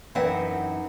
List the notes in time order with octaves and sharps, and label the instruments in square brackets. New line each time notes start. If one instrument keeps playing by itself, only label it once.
[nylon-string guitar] F#2 E3 C4 D#4 E5 F#5